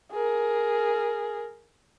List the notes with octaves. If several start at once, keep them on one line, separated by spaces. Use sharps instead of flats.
G#4 A#4